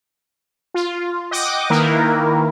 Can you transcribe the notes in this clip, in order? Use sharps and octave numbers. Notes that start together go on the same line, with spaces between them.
F4
D#5 F#5 G5 D6 D#6
D#3 A#3 E4 A#4 B4